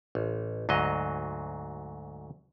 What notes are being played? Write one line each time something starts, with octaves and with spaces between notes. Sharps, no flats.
A1
D2 G#2 F#3 D#5